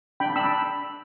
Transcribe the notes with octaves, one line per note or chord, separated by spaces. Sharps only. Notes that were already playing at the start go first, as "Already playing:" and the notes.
D4 G5 B5
D4 B5 E6